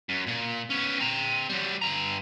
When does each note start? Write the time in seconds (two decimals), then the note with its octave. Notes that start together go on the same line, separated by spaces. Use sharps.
0.09 F#2
0.27 A#2
0.70 B3 C#4
0.99 C4 A#5
1.49 F#3 G3
1.82 G2 A#5